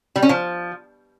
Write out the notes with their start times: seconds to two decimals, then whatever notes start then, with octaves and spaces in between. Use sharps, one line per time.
0.16 G3
0.22 C#4
0.29 F3